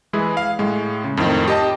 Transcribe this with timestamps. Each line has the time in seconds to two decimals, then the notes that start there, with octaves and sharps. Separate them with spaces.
0.13 E3 G#3 E4 G#4
0.37 F5
0.59 A2 G#3
1.04 C#3
1.17 F2 A2 D#3 F3
1.48 G4 D#5 A5